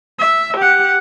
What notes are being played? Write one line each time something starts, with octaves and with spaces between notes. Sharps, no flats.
E5
G4 F#5